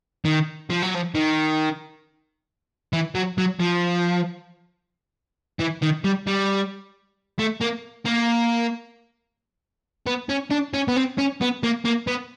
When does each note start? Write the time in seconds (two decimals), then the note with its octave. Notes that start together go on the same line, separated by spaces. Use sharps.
0.25 D#3
0.70 F3
0.82 F#3
0.94 F3
1.15 D#3
2.93 E3
3.15 F#3
3.38 F#3
3.60 F3
5.60 E3
5.83 D#3
6.05 G3
6.27 G3
7.39 A3
7.61 A#3
8.06 A#3
10.07 B3
10.29 C#4
10.51 D4
10.74 C#4
10.88 B3
10.96 C4
11.18 C#4
11.41 B3
11.63 A#3
11.85 A#3
12.07 B3